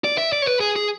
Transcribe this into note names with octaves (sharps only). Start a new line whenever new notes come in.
D5
E5
D5
C#5
B4
G#4
G#4